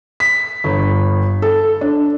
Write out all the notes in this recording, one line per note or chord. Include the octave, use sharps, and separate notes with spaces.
B6
G1
A4
D4